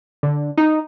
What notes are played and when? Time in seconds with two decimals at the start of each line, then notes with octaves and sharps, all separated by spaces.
0.23 D3
0.58 D#4